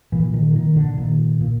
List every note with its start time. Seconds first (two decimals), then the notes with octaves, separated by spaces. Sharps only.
0.12 A#2 E3
0.34 D#3
0.55 A#2 D#3
0.76 D3
0.97 A#2 D#3
1.41 A#2